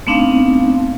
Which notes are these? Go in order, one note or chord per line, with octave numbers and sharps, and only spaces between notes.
A3 B3 C4 D4 D#4 F5